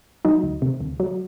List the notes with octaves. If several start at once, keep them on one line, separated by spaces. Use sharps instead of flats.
F#3 D#4
D2
C3
D2
F#3